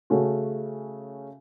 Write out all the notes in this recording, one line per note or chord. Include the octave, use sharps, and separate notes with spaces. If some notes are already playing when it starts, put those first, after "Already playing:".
C#3 A3 C#4 F#4